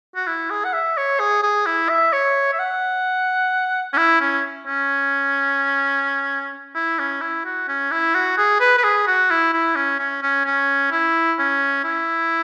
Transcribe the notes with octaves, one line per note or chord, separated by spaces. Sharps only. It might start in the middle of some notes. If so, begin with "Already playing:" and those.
F#4
E4
G#4
F#5
E5
C#5
G#4
G#4
E4
E5
C#5
E5
F#5
C#4
E4
C#4
C#4
E4
C#4
E4
F#4
C#4
E4
F#4
G#4
B4
B4
G#4
F#4
E4
E4
C#4
C#4
C#4
C#4
E4
C#4
E4